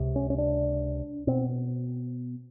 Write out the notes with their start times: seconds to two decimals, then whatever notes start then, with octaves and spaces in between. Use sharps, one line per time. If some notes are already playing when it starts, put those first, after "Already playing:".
Already playing: C#2 C3
0.16 C#4
0.30 C#4
0.38 D4
1.27 B2 C4